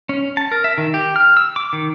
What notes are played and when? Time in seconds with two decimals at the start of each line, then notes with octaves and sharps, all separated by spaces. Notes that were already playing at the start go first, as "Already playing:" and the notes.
0.09 C#4
0.37 A5
0.52 A#4
0.64 E5
0.78 D#3
0.94 G4
1.16 F6
1.37 E6
1.56 D6
1.73 D#3